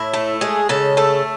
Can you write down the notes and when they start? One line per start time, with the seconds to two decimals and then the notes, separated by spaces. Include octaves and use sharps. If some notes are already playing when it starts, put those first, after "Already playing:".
Already playing: A2 E4
0.14 A3
0.41 G#3 G#4
0.69 C#3 A4
0.97 A3 A4